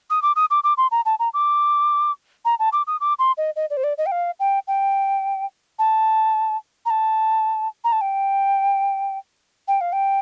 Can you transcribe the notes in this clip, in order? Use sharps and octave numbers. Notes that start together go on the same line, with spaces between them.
D#6
D6
D#6
D6
D6
C6
A#5
A5
A#5
D6
A#5
A5
D6
D#6
D6
C6
D#5
D#5
D5
C5
D5
D#5
G5
F5
G5
G5
A5
A#5
A5
A#5
A5
G5
G5
F5
G5